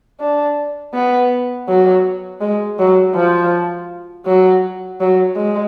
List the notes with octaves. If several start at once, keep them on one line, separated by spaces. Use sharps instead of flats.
D4
B3
F#3
G#3
F#3
F3
F#3
F#3
G#3